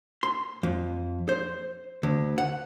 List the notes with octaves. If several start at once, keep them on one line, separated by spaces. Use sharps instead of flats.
C6
F2
C5
D2
F#5